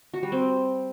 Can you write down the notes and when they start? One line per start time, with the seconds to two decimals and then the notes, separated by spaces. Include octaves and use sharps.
0.14 F#4
0.23 G3
0.32 C4